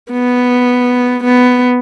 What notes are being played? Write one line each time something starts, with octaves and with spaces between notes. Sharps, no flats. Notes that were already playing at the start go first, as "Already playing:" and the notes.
B3
B3